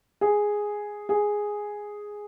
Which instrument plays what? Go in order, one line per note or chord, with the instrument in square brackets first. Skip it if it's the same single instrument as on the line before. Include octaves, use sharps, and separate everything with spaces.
[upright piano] G#4
G#4